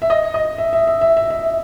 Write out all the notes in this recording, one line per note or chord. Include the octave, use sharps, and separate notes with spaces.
E5
D#5
D#5
E5
E5
E5
E5
E5
E5